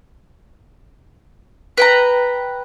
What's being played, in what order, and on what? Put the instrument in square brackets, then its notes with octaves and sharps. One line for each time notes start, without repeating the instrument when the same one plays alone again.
[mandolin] B4 G5 A#5